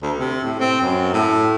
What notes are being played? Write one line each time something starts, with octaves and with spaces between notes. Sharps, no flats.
D2
C3
A2
C4
F#2
A2